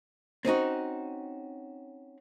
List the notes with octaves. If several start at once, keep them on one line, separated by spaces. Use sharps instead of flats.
C4 C#4 D#4 F#4